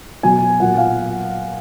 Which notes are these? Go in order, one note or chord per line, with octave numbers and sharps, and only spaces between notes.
B2 F#3 G#5
A#2 F#3 F#5
F5